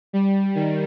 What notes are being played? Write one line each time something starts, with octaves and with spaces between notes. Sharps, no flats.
G3
D#3